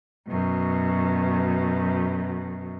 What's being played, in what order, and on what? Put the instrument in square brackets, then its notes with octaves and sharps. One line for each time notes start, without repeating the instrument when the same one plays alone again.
[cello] F#2 B2